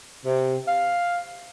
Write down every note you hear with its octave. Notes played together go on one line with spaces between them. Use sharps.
C3
F5